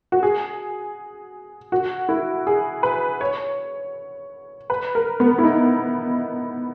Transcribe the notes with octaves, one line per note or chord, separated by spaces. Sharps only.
F#4
G#4
F#4
E4
G#4
B4
C#5
B4
A#4
B3
E4
D#4